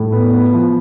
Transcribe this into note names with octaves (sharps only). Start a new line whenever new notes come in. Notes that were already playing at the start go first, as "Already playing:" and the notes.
Already playing: A2
B3
B3
F3